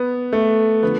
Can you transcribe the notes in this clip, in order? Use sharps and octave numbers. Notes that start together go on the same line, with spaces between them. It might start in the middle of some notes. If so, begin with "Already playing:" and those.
Already playing: B3
A3
D3 F3 B3